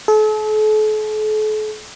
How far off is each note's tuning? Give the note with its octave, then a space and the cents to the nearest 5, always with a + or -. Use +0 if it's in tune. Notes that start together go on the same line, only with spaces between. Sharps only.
A4 -40